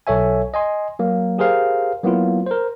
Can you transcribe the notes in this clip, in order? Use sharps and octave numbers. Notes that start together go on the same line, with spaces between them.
B1 A4 C#5 E5 G#5
D#5 G#5 C6
F#3 A#3
G4 G#4 A#4 C5 F5
F#3 A#3 B3 E4 F4
A#4 C5